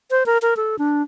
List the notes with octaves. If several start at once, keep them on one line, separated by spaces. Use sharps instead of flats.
C5
A#4
A#4
A4
D4